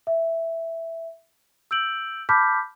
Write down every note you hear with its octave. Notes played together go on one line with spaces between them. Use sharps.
E5
E6 G6 D7 F#7
A5 B5 D6 F6 G6 B6